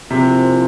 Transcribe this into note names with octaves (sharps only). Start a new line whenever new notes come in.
C3 F3 A#3 E4 G#4 C5